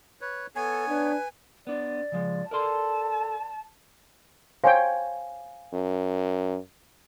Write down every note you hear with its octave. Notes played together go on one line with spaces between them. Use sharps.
B4 C#5
B3 A4 C#5 G#5
D4 B4
B3 D4 D5
C#3 F3 G#3
A4 A#4 D5 A5 C6
C5 C#5 F5 G5 G#5
F#2